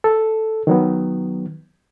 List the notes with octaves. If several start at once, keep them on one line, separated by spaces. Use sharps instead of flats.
A4
D#3 F#3 B3